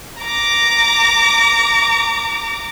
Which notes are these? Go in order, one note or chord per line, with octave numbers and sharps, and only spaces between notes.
A#5 D6